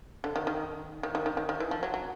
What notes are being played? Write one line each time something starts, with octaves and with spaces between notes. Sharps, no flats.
D3
D#3
D#3
D#3
D#3
D#3
D#3
D#3
E3
F3
F#3
F#3